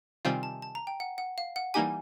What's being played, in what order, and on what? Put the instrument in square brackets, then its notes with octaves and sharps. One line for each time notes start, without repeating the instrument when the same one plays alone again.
[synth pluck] C3 D#3 G3 C4 F4 [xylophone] G#5
[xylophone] A5
A5
A#5
G5
F#5
F#5
F5
F#5
[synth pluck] E3 G3 A#3 D#4 G4 [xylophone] G#5